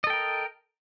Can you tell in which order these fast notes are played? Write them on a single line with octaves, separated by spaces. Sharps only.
D#5 A4 G5 A#4